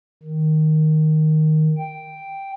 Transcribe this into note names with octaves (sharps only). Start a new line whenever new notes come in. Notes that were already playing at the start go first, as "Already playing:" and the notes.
D#3
G5